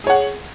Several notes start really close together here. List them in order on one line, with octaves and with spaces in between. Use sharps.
G#4 C#5 F#5